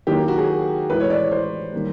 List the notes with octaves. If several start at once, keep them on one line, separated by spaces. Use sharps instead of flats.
D#3 F#3 A#3 G4
F#4
G#4
A2 E3 G#3 B4
C#5
D5
C#5
C5
D#3 G3 A#3